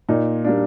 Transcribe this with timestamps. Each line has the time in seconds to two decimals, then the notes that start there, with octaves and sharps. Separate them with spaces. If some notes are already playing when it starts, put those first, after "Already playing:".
0.09 A#2 D#4
0.44 G3 A#3 D4